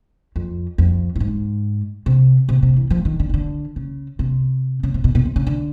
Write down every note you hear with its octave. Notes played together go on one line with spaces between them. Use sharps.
F2
F2
A2
G#2
C3
C3
C3
E3
F3
D#3
D3
D#3
D3
C#3
C3
C#3
C3
B2
B2
C3
C#3
D3